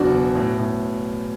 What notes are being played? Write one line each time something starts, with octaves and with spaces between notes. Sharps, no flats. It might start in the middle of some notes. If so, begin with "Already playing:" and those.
Already playing: F#1 E2 B2 D4 F#4
B2
A2
A2